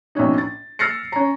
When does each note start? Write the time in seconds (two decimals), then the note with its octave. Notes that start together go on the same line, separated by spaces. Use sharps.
0.15 A#1 B2 C#4 D#4
0.38 A6
0.79 E6 F6 A6 A#6 C7 C#7
1.12 C#4 A#5